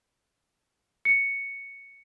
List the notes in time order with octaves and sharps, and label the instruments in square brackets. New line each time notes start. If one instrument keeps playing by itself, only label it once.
[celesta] C#7